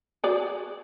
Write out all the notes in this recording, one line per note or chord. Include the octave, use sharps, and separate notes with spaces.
F#4 G#4 D5